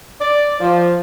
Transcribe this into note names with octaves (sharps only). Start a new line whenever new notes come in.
D5
F3